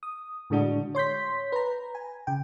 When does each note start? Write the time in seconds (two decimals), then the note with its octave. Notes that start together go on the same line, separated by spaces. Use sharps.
0.03 D#6
0.50 A2 D3 G#3 D4 F#4
0.95 C#5 C6 G6 B6
1.52 B4 A#5
1.95 G#5
2.27 C#3 G5